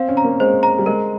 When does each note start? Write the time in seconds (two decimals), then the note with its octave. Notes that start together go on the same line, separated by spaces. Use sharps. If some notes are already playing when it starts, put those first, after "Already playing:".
Already playing: C4 F5
0.08 C#4
0.17 A#5
0.24 A#3
0.40 G#3 C5
0.63 A#5
0.78 G3
0.86 G#3 A#4